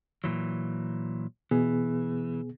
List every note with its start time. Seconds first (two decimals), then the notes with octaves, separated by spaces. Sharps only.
0.24 A#2 E3 F#3
1.51 B2 E3 B3 G#4